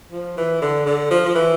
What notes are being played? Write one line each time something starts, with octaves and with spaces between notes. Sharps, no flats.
F3
E3
D3
D3
F3
F3
E3